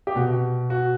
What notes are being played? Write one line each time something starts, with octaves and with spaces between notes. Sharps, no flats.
G4
B2 F#4
F#4